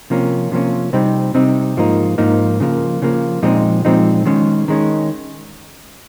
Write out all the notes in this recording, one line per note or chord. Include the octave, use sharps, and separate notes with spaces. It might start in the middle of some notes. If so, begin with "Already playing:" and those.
C3 F3 A#3 C#4
C3 F3 A#3 C#4
C3 G3 C4 D#4
C3 G3 C4 D#4
G#2 F3 A#3 D#4
G#2 F3 A#3 D#4
C#3 F3 A#3
C#3 F3 A#3
A#2 F3 G#3 C4 D#4
A#2 F3 G#3 C4 D#4
D#3 G#3 C#4
D#3 G#3 C#4